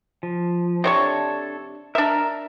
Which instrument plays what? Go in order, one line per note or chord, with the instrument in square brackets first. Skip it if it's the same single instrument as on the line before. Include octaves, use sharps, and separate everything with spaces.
[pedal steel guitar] F3
[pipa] C3 C#5 C#6 [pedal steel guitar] D4 A4
[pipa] D4 E5 [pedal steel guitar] A#4